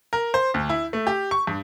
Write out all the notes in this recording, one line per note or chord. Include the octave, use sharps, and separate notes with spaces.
A#4
C5
D2
E4
A3
G4
C#6
G2